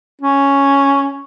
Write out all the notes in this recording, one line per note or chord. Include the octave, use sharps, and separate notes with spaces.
C#4